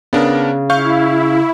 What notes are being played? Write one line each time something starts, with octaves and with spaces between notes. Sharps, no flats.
C#3 B3 D4 A#4
E4 F5 C#6 G6